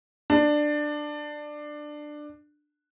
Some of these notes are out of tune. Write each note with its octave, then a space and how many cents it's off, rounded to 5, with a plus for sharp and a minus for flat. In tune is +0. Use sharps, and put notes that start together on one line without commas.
D4 +15